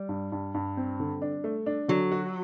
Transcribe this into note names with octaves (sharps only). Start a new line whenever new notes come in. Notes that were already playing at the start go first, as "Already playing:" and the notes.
Already playing: G3
G2
G2
G2
C4
D3
D4
A3
D4
D3 F#3
F#4